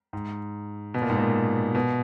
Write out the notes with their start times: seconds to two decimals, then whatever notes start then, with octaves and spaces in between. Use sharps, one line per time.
0.13 G#2
0.94 B2
1.02 A#2
1.10 G#2
1.17 A#2
1.75 B2